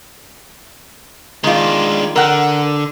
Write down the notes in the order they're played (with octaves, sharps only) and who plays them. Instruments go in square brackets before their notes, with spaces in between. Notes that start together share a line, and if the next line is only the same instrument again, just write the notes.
[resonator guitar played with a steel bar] D#3 F4 [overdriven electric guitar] G#3 D4
[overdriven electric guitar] D3 [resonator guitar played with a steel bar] A#4 F#5